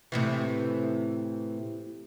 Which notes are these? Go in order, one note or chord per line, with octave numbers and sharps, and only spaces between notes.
A2 C3 E3